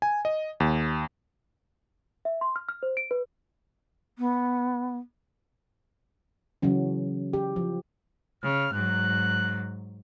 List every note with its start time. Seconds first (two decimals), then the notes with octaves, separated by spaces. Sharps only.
0.02 G#5
0.25 D#5
0.60 D#2
2.25 E5
2.41 C6
2.56 F6
2.69 F6
2.83 C5
2.97 D7
3.11 B4
4.19 B3
6.62 C#3 E3 F#3 C#4
7.33 G4
7.56 F3
8.43 C#3 F6
8.73 G#2 F#3 F#6